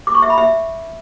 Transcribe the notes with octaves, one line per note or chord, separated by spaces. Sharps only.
D6
C#6
E5
B5
E5